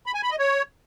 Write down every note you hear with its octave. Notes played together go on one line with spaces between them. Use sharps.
B5
G#5
B5
D#5
C#5